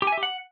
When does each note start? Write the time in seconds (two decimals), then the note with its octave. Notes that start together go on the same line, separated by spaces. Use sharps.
0.02 G4
0.07 G#5
0.12 E5
0.18 G4
0.23 F#5